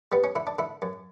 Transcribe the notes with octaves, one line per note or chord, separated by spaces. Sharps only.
G3 B3
C#4
D3 E4
D4
D3 E4
F#2